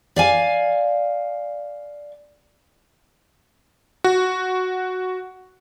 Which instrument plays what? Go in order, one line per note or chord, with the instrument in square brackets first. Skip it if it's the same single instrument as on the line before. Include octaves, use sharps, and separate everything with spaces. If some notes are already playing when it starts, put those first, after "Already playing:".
[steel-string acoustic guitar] D5 F5 G#5
[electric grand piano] F#4